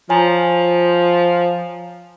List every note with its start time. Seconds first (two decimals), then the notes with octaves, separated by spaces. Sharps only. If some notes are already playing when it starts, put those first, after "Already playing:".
0.09 F3 C#5 G#5 A#5